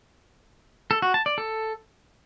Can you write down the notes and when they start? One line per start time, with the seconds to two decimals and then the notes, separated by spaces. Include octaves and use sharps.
0.91 A4
1.02 F#4
1.14 A5
1.26 D5
1.38 A4